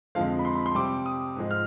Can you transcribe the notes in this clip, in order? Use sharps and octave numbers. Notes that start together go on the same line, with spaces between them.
F2 D3 F3 G#3 F5
B5
C6
B5
C6
C3 G3 D6
D#6
G#2 F3 G#3
F6